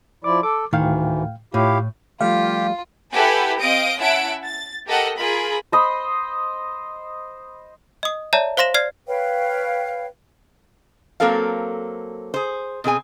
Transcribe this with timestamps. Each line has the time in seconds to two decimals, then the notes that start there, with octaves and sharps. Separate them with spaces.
0.24 F3 E4 D5 D6
0.43 A4 D6
0.73 D2 A2 D#3 E3 F5 G5
1.54 A2 E4 F4 G4 C#5 F5
2.21 F3 G3 A3 F4 G4 F5
3.13 E4 G4 A4 B4 F#5 G#5
3.60 C4 D#5 F5 D#6 D7
3.99 C#4 E4 E5 F#5 A5 D7
4.44 A6
4.86 G4 A4 A#4 D#5 F#5
5.19 F4 G#4 A#4 B5
5.72 C5 D#5 B5 C6
8.03 D#5 D#6
8.33 C#5 D5 E5 A5 A#5
8.57 C5 F5 C6 A#6 E7
8.74 D5 F6 G#6 C7
9.07 B4 C#5 F5 G5
11.20 F#3 A#3 C4 A4 A#4 F5
12.34 G#4 C5
12.84 B2 C4 G#4 G#5